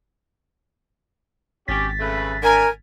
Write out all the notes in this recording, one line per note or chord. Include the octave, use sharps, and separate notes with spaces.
G#1 C#4 G4 A6 B6
C#3 A3 B4
D3 A#4 G#5